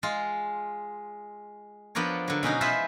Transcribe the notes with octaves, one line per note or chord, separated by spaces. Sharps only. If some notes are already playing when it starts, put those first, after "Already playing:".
G#3 F4
F3 B3 D4 A#4 C#5
D3 F#3
B2 C#4 D#4 F#4
G#3 E4 F4 B4 C5 E5